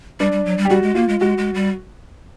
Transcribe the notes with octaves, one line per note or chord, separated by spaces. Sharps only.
G3 D4
G3
F#3
G3
G4
G3 F#4
G#3
A#3 F4
G#3
G#3 F#4
G#3
G3